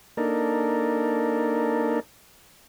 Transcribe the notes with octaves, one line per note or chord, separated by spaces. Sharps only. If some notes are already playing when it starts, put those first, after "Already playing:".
A#3 D4 D#4 A4 A#4